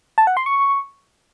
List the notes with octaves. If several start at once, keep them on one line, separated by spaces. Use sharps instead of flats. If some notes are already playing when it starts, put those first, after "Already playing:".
A5
F#5
C6
C#6